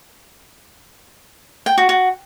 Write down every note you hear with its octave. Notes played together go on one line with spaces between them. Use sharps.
G5
F#4
F#4